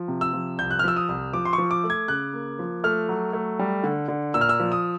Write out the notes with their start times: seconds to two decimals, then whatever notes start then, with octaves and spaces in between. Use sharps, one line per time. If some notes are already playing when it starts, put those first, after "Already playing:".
Already playing: F3
0.08 C3
0.21 E6
0.33 F3
0.58 C2 G6
0.71 F#6
0.79 F6
0.84 F3 E6
0.96 D#6
1.09 C2
1.33 F3 D6
1.45 C6
1.53 C#6
1.58 F3
1.71 D6
1.84 A3
1.90 G#6
2.08 C#3 F#6
2.33 A#3
2.59 F3
2.84 A3 F6
3.09 F#3
3.33 A3
3.59 G3
3.83 D3
4.08 D3
4.34 A#2 E6
4.41 F6
4.49 E6
4.60 F3
4.72 D#6